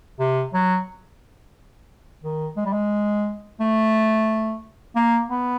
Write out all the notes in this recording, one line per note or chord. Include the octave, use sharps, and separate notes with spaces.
C3
F#3
D#3
G#3
G3
G#3
A3
A#3
B3